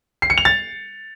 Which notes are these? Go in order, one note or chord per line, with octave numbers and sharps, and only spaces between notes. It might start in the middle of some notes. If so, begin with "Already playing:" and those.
C7
C#7
F7
A6